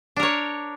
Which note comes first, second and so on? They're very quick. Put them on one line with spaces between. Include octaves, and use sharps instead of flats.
D4 A#4 C#5